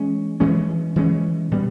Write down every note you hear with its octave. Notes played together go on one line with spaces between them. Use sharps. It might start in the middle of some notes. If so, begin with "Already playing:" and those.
Already playing: E3 G#3 C#4
E3 G#3 C#4
E3 G#3 C#4
B2 G3 B3